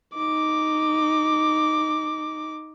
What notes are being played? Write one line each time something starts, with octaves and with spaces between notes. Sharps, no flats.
D#4 D6